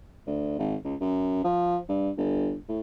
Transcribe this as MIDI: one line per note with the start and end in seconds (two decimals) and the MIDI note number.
0.26 0.57 38
0.59 0.75 32
0.84 0.95 37
1.00 1.41 42
1.44 1.78 53
1.89 2.10 43
2.17 2.56 31
2.68 2.80 45